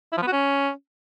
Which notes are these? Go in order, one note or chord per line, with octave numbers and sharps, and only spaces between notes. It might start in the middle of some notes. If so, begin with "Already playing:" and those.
E4
F3
B3
F#4
C#4